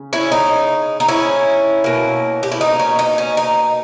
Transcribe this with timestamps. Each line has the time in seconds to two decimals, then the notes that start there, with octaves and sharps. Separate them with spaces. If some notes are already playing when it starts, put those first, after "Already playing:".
Already playing: C#3
0.13 C#4 E4
0.32 D#4
1.00 D#4
1.08 C#4 E4
1.84 B2 A#3
2.43 G4
2.52 E4
2.61 D#4
2.80 C#4
2.99 D#4
3.18 C#4
3.37 D#4